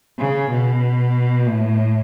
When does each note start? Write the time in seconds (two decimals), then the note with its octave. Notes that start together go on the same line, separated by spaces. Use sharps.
0.19 C#3
0.51 B2
1.47 A2